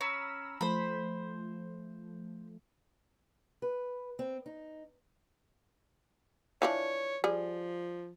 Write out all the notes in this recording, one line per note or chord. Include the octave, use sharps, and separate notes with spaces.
C#4 A#5 B5 E6
F3 A3 C5 B5
B4
C4
D#4
E3 F3 D4 C#5
F3 G3 G#4